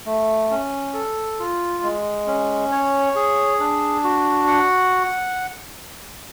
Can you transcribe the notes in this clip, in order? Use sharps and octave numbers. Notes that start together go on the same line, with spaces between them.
A3
C#4
A4
F4
G#3
C#4
C#5
G#4
D4
F#4
F#5